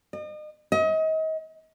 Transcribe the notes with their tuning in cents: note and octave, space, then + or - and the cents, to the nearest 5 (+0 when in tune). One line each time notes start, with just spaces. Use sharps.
D#5 -40
D#5 +35